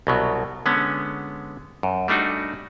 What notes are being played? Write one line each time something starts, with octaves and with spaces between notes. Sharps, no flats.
C2 B2 F#3
D3 G#3 B3 C#4
F#2
G3 A3 D4 D#4 F#4